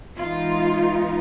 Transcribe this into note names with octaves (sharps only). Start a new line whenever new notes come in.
E3 G#3 B3 D#4 F4